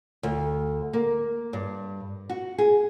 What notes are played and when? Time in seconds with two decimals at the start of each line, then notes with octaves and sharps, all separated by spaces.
0.23 D2
0.93 A#3
1.53 G2
2.29 F#4
2.58 G#4